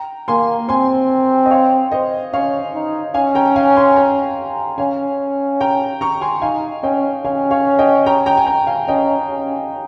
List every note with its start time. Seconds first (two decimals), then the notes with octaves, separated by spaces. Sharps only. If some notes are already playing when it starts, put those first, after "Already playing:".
Already playing: G5 A#5
0.28 A#3 G#5 C6
0.69 C4 G#5 C6
1.46 D#5
1.51 C#5 F5
1.92 C5 D#5
2.33 C#4 C#5 F5
2.74 D#4
3.14 C#4 F5 G#5
3.35 G5 A#5
3.56 F5 G#5
3.76 G#5 C6
3.96 G5 A#5
4.78 C#4 F5 G#5
5.61 G5 A#5
6.01 A#5 C#6
6.21 G#5 C6
6.42 D#4 F5 G#5
6.83 C#4 D#5 G5
7.24 C#4 F5 G#5
7.51 C#5 F5
7.79 D#5 G5
8.06 G5 A#5
8.26 G5 A#5
8.37 G#5
8.46 G5 A#5
8.67 F5 G#5
8.88 C#4 D#5 G5
9.29 C#4